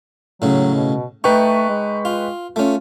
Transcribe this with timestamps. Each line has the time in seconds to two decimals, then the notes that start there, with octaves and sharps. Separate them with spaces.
0.42 A2 C#3 F#3
0.74 B2
1.24 A3 D#4 B4 G5 C#6
1.69 G#3
2.05 F4
2.56 A3 C#4 F4